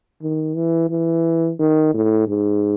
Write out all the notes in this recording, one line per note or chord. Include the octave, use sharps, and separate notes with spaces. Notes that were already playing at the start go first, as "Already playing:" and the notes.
D#3
E3
E3
D#3
A2
G#2